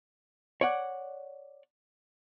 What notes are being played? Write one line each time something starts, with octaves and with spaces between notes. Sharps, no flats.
C#5 D5 F#5